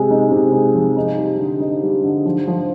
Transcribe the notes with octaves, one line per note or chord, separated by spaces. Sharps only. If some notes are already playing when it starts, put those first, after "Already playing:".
Already playing: C3 G#3
D#4
C3
G#3
F3
D#4
G3
D3
D#4
G3
D3
F3
F3